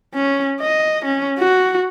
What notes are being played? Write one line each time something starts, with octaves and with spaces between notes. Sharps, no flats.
C#4
D#5
C#4
F#4